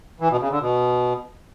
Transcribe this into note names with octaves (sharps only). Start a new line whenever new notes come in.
E3
B2
C#3
D3
B2